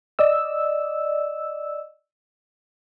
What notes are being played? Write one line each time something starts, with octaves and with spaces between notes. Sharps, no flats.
D5 D#5 E6